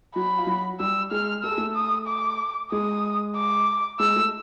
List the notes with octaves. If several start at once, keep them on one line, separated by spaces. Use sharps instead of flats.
F#3 F#4 B5
F4
F#3 F#4
G3 G4 E6
G#3 G#4 F6
A4 E6
G#4
A3 A4
D#6
D6
G#3 G#4 D#6
D6
G#3 G#4 E6
A3 A4